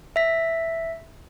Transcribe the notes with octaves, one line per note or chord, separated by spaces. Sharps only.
E5 B6